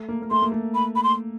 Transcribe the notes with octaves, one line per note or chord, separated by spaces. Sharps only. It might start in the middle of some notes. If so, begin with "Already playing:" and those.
Already playing: A3
A#3
A#3
A3 C6
A#3
A3
B5
B5
C6